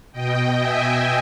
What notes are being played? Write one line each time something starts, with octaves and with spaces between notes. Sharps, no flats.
B2 D#5 G5
E5 G#5